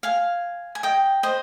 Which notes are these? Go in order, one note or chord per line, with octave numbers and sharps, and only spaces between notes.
F5 G#5
G#5
D#5 G5
C5 D#5